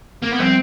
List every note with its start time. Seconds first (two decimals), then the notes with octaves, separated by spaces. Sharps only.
0.22 A#3
0.31 B3
0.39 F3 G3 C4